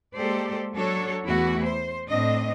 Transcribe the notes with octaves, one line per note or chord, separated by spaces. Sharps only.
G#3 A#3 G4 A4 C5 D5
F#3 D4 F#4 A4 C#5
E2 E3 A3 E4 F#4
C5
A2 C4 D4 D#5